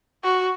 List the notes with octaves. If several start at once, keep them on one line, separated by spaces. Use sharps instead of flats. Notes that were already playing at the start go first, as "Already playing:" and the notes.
F#4